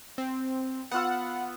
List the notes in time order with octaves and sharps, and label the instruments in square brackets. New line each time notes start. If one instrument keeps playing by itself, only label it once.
[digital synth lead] C4
[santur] B3 F4 E6 [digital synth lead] F#5